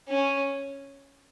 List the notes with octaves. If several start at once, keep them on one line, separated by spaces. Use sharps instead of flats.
C#4